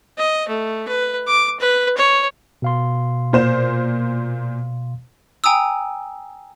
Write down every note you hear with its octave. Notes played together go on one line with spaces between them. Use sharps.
D#5
A3
B4
D6
B4
C#5
B2 F5 C6
A#2 C5 E7
G5 G#5 A#5 D#6 E6